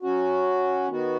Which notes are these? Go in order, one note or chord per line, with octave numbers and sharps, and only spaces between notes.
F#3 C#4 F#4
D#3 B3 F#4